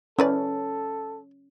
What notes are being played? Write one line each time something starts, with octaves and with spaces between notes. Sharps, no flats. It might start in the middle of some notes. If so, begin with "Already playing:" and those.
C#4 E4 A4 B4 D5